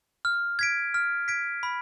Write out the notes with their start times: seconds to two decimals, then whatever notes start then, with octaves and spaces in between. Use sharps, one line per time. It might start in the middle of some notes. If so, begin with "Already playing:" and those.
0.25 F6
0.59 G#6 B6 D7
0.94 F6
1.28 G#6 B6 D7
1.63 B5